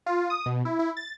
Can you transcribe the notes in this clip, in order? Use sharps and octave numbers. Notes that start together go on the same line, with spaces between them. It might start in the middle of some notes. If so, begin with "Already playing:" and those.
F4
D#6
B2
E4
E4
A6